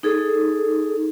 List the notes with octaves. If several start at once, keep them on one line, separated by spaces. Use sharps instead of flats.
D#4 G#4 A4